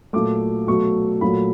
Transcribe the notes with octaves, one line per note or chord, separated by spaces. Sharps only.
A#2 F#3 A3 D6
B2 F#3 A3 C#6
A#2 F#3 A3 B5